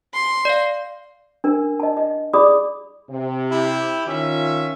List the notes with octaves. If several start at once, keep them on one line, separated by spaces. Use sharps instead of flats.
C6
D5 F5
D4 A#4 G#5
D#5 A5
D#5
G#4 D5 B5 D6 D#6
C3
E4 G4
D#3 C#4 F4 E5